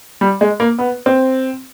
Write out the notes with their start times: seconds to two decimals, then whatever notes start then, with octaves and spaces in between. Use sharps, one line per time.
0.21 G3
0.41 G#3
0.60 A#3
0.79 B3
1.06 C4